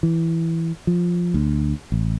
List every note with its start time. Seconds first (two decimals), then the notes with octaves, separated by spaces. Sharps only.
0.03 E3
0.87 F3
1.34 D2
1.92 A1